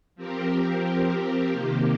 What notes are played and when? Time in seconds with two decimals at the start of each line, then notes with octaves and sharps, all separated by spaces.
0.16 F3 C4 G4 A#4
1.51 C3 D#3 A#3 G4